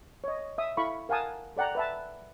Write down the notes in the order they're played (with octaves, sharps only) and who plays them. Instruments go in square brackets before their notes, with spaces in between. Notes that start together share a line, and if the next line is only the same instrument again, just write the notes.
[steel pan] C#5 D#5
E5 D#6
E4 A4 F5 B5 C#6
A#4 F5 F#5 G#5 A5 D#6
A4 D5 F#5 G5 A#5
B4 E5 A5